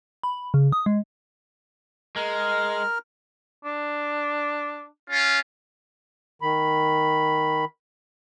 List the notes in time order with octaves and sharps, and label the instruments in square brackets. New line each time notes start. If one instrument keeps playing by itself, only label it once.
[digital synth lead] B5
C#3
D#6
G#3
[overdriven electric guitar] G#3 [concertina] A#4 F6
[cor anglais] D4
[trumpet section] C#4 F4
[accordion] D#3 B5